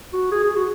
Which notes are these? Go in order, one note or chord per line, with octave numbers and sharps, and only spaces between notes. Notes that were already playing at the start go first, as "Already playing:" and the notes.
F#4
G#4
G#4
F#4